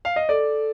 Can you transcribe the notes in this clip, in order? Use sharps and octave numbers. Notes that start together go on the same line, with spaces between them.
F5
D#5
A4 D5